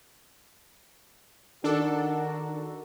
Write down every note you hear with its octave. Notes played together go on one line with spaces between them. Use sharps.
D#3 D4 F#4 A4 A#4